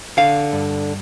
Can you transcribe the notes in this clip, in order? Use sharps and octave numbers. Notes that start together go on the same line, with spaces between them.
D3 F5
G2